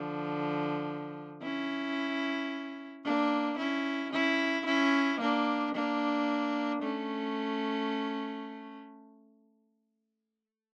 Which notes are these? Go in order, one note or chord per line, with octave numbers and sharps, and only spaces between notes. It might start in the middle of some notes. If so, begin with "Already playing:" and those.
Already playing: D3 F3
C#4 E4
A#3 D4
C#4 E4
C#4 E4
C#4 E4
A#3 D4
A#3 D4
A3 C#4